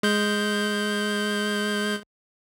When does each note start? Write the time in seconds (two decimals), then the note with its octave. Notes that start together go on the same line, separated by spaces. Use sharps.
0.03 G#3 G6